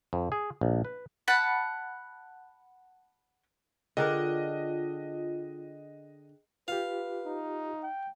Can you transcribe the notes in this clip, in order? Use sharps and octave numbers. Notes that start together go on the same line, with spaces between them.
F2
G#4
A#1
B4
F#5 A5 B5
D3 D4 F4 G#4 A#4 D#5 G5 F#6
F4 G4 B4 F5
D#4
G5